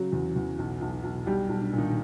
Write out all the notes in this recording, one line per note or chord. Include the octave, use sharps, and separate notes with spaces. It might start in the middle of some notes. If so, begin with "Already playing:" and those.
Already playing: C#3 F#3 F#4
E2
E2
B1
B1
B1
B1 G3 G4
B1
D4
A#2
D#3 D#4